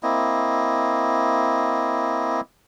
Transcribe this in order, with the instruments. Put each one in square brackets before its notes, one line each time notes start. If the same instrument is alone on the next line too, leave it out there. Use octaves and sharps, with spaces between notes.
[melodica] A#3 C4 E4 D#5